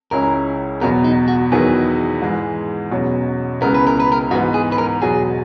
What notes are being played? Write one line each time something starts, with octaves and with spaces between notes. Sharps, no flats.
C#2 C#3 G#3 C#4 E4 A#4
E2 B2 F#3 A#4
D#4
F#4
E2 D#3 F#3 B3 E4 G#4
G#2 E3 G#3
E2 B2 F#3 C#4
C#2 C#3 G#3 B3 E4 A#4
B4
A#4
B4
A#4
G#2 E3 B3 F#4
G#4
B4
A#4
E2 B2 F#3 G#4